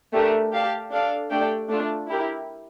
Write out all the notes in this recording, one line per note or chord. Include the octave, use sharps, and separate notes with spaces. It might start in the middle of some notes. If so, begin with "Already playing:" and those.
A3 D4 G4 A#4
G4 D5 F5 A5
D4 A4 D5 F5
A3 D4 G4 D5 G5
A3 D4 F4
E4 G4 A#4